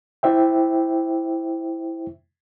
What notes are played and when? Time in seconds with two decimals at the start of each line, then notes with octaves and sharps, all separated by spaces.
0.23 E4 C5 E5 G5